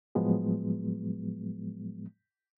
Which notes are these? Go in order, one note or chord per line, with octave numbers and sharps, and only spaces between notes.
A2 F3 F#3 G#3 B3